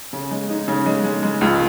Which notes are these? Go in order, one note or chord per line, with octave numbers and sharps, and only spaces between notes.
C#3
G#3
D#4
C#3
G#3
G#3
G#3
C#2